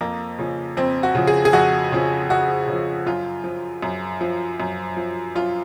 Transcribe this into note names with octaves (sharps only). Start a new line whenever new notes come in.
F2 A#3
C#3 F3
F2 C4
F#4
C#3 F3
G#4
G#4
F2 F#4
C#3 F3
F2 F#4
C#3
F3
F#2 F4
F3
F#2
F3
F#2
F3
F#2 F4